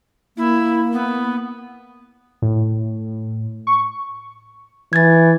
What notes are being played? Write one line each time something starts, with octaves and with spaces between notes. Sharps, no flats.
A#3 E4
B3
A2
C#6
E3 G#6 A6